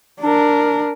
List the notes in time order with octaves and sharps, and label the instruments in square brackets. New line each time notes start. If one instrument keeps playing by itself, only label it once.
[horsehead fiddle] D4 A#4